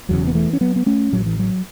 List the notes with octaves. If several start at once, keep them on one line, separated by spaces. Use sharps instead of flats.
E1 E2 C#3 F#3
B3
E3 A3
C#4
F#3 B3
B3
A3 C#4
A1 A2 F#3
E3
F#3